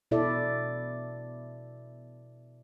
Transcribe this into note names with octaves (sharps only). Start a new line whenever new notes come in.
B2 E4 A4 D5 E5